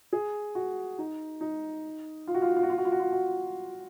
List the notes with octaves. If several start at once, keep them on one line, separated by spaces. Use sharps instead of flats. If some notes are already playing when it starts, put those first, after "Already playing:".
G#4
F#4
D#4
D#4
F4
F#4
F4
F#4
F4
F#4
F4
F#4
F4
F#4
F4
F#4